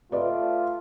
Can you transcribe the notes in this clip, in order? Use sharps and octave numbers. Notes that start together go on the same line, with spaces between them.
A3 F4 B4 D5 D#5